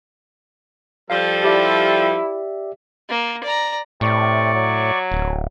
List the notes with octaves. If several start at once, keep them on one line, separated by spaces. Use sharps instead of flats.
F3 G3 A4 F5
E4 G4 D5 E5
A#3
D5 A#5
A2 C3 D5 C#6
F#3
D1